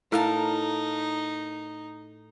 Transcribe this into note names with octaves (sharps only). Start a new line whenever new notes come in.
A2 D#4 A#4 F5 A5